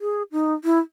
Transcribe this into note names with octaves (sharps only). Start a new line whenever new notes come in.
G#4
D#4
E4